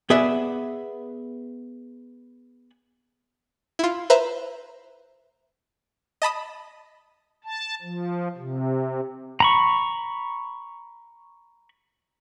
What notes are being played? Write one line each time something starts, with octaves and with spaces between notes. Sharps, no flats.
B3 G#4 B4 D5 E5
E4 F4
B4 C5 E5 A#5
D#5 A5 B5 D#6
A5
F3
C3
A#5 B5 C#6